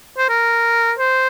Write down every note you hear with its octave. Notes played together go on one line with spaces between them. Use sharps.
C5
A#4
C5